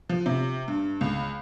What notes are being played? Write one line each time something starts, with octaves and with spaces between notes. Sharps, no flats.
F3
C3
G2
C#2